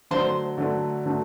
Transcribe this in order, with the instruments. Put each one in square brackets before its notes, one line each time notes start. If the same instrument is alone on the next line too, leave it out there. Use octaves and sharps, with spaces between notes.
[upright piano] D3 F#3 A3 D4 [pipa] C5
[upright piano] D3 F#3 A3 D4
D3 F#3 A3 D4